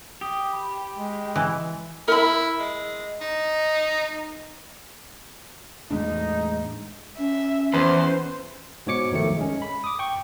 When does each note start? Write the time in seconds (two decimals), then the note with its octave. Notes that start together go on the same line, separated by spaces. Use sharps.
0.21 G4 D#6
0.53 B5
0.95 G#3
1.36 E3 G#5
2.08 E4 A#4 B5
2.59 G#3
3.21 D#4
5.90 E2 A2 G#3 D4 D#4
7.18 C#4 E5
7.74 E2 B4 C5
8.87 G#2 B2 C#5 D6 C#7
9.12 B1 D#3 F3 A3 C#7
9.37 G#3 C#4
9.62 B5
9.84 D6 D#6
9.99 G5 C#6